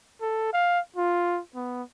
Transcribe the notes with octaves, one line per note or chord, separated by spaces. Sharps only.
A4
F5
F4
B3